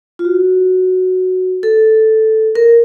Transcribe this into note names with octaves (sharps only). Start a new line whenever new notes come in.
F4
F#4
A4
A#4